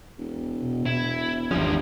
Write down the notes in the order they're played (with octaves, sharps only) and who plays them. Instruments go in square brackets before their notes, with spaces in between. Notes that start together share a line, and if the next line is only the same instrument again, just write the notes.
[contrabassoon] E1
[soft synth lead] B2
[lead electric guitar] E4 [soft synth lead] G#6
[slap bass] G#1 E2 F3 [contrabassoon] G2 [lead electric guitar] C#4 E4